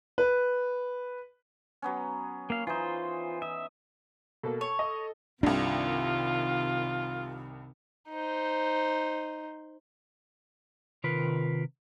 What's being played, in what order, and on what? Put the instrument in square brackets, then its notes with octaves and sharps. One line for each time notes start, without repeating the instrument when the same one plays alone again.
[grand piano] B4
[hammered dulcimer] F#3 B3 C#4
[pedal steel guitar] A#3 F5
[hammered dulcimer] E3 D#4 [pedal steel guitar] F4 C5
[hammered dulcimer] D#5 [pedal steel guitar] E5
[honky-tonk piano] B2 A#3 [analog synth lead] A4
[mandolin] C#5 [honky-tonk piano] C#6
[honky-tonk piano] D#5
[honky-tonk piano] C2 G2 [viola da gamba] C3 D#3 [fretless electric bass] D4 [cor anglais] F4
[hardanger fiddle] D#4 C5
[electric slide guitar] C3 D#3 F4 A#4 B4